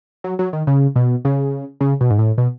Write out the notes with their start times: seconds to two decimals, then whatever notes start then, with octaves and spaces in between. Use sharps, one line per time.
0.24 F#3
0.39 F#3
0.53 D#3
0.67 C#3
0.96 B2
1.25 C#3
1.81 C#3
2.01 B2
2.11 G#2
2.19 A2
2.38 B2